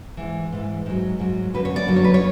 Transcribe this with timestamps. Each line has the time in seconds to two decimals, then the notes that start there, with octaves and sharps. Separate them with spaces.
0.17 G#2 E3
0.53 G#2 E3
0.86 G#2 F#3
1.20 G#2 F#3
1.54 F#2 D3 F#3 B4
1.65 C#5
1.76 D5
1.88 F#2 D3 F#3
1.96 C#5
2.04 B4
2.14 C#5